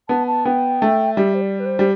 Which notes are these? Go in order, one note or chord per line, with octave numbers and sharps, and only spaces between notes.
B3 A5
A5
B3 G5
A3
G3 E5
C5
D5
B4
C5
G3